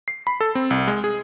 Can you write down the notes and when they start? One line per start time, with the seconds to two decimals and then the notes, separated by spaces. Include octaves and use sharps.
0.08 C7
0.27 B5
0.41 A4
0.55 C4
0.70 C2
0.87 G#3
1.04 G#4